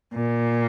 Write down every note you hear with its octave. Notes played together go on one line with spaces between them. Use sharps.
A#2